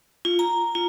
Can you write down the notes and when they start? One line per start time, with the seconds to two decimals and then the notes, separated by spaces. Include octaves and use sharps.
0.25 F4
0.39 A#5
0.75 F4